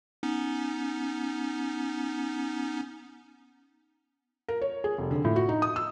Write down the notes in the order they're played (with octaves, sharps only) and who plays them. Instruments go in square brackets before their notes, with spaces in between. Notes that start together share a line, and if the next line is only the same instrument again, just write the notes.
[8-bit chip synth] B3 C#4 D#4
[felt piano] A#4
C#5
G#4
F1
D3
A2
F#4
D#4
D#6
E6